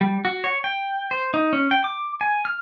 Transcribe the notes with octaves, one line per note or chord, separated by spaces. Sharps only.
G3
F#4
C#5
G5
C5
D#4
C#4
G5
D6
G#5
F6